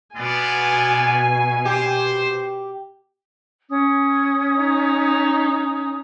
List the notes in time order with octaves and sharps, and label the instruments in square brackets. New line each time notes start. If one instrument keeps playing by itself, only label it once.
[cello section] B2 [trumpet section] B3 F4 D5 [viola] G#5
[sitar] G4 [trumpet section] C5
[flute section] C#4 D#6
[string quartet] D#4